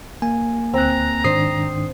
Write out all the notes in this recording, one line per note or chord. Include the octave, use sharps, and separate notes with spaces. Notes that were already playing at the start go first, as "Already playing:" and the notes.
A#3 G#5
D2 C4 A#5 F#6
G#2 D#3 D4 C5 D#6 C7